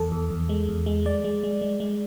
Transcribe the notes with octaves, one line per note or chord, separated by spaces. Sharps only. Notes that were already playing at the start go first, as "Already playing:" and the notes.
Already playing: E2 A4
E2
E2
G#3
E2
G#3
G#3 D5
G#3
G#3
G#3
G#3